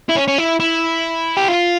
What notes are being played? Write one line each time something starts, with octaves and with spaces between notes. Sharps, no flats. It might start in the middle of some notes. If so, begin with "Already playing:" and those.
E4
C#4
C#4
E4
E4
G4
F4